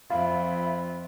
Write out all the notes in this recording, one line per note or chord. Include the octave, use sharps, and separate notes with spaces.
F2 F4 E5 B5